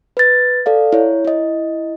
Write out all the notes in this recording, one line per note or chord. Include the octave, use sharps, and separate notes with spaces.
B4 A6
A4 D5 F5
E4 C#5
E4 D#5